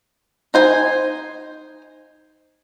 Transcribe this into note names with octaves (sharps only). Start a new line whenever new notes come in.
D#4 C5 G#5